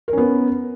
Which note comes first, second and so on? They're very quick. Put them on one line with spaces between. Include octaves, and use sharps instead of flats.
A#4 C#4 B3